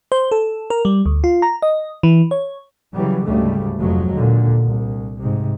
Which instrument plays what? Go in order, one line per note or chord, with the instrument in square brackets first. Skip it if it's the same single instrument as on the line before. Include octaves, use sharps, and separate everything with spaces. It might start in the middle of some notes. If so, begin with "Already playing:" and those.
[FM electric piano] C5
A4
A#4
G3
D2
F4
A#5
D#5
E3
C#5
[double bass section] C#3 E3 F#3 G3
D2 G#2 C#3 G3 A3
F1 F3 F#3 G#3
D#2 A#2 D3
C2
G#2 C3